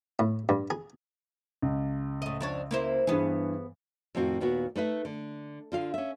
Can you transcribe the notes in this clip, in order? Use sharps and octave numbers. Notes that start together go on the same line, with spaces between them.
A2
G2
G#4
C#2
A2 D#5
F2 D4 C#5
A#3 E4 C5
G2 E3 B3 G#4
F2 A2 D#3 C4 F#4
D#2 A#2 B3 F#4
A3 D#4 B4 E5
D3
D3 F4 F5
C#4 E5